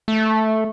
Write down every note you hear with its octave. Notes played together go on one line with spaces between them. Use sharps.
A3